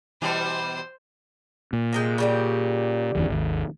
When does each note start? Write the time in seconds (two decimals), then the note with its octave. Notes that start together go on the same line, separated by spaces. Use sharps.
0.22 B2 E3 G3 C5 C6
1.73 A#2
1.93 C3 G#3 G5
2.18 C#3 G3 G4
3.15 G1 E2 D#3
3.29 G#1 D#2